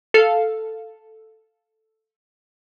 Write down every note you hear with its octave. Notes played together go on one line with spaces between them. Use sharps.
A4 F5